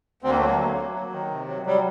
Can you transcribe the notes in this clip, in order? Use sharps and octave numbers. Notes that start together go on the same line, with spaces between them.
D2 C4
A#3
A3
F#3 A#3
F#3
F#3
F#3
D#3
C3
F#3
F#3 G3